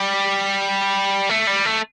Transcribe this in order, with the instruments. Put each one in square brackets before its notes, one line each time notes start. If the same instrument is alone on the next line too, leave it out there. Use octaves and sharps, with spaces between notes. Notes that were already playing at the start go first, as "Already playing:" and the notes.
Already playing: [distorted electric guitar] G3
A3
G3
A3